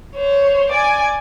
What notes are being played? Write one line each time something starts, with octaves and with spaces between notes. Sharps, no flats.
C5 C#5
D5 G#5